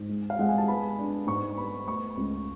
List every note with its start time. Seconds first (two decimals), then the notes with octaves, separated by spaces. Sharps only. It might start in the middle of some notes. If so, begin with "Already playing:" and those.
Already playing: G#2
0.09 G#3
0.30 F5
0.39 G#3 F#5
0.49 G#5
0.58 A5
0.68 B3 B5
0.99 D4
1.27 G#2 C#6
1.57 B3 B5
1.88 A3 C#6
2.17 C#2